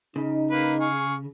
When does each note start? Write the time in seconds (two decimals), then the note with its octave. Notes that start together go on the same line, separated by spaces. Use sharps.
0.16 C#3 D#4
0.51 A#3 B4
0.80 G#4 F5 C#6